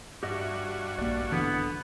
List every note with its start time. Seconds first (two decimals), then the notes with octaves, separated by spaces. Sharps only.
0.23 G2 F#4 G4 D#5 E5
0.98 A#1 A#3 D5
1.32 D3 E3 B3